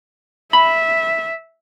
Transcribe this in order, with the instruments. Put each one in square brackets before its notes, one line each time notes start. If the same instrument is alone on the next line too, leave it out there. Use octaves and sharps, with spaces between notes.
[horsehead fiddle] E5 [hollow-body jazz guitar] B5